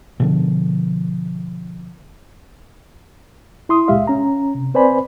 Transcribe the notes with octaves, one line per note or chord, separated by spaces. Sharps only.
B2 D3 F3
E4 C6 D#6
C#2 A#2 G#3 G4 E5 F5
C#4 A#5
C3
C4 B4 C5 D5 G#5 B5